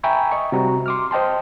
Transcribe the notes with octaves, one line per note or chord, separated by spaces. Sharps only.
E5 G5 G#5 A#5 B5 C#6
D#5 C#6
C3 G3 F#4 A#5
C6 D6 F6
C5 D#5 G5 A5 C6